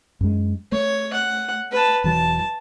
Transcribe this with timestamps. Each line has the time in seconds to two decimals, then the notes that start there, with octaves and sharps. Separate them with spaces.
0.21 F#2 G#3
0.72 A3 C#5
1.13 F#5
1.72 B4 A5
2.04 E1 E3 F#3 A5